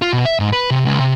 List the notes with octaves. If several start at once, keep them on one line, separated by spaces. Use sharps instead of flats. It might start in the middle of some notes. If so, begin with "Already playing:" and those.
F4
B2
E5
G#2
B4
C3
C#2
C3